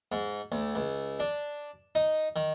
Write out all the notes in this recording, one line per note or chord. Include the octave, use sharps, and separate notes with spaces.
G#2
D2
C#2
D4
D#4
D#3